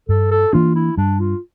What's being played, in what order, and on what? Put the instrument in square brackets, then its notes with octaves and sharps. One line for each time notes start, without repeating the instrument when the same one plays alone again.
[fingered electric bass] G2 [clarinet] A4
[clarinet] A4
[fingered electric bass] E3 A#3 D4 [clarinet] F4
[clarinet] E4
[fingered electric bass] G2 [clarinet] D4
[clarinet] F4